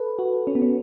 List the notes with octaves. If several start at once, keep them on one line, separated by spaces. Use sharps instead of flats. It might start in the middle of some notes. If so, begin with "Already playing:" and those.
Already playing: A4 B4
F#4
C#4
B3
C#4